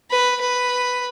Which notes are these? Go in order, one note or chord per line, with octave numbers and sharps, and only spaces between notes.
B4
B4